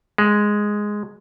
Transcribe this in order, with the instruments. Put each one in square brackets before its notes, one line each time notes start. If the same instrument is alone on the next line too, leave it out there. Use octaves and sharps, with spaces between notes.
[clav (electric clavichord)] G#3